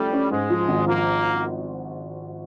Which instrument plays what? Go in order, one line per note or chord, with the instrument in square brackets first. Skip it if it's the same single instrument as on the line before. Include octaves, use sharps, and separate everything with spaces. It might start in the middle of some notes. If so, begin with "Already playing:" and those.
Already playing: [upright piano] F3 A3 C#4 [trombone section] G3
[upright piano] C#4
[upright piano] G#2 [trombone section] G#3
[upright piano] F3
G#1
[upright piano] F3 [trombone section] A#3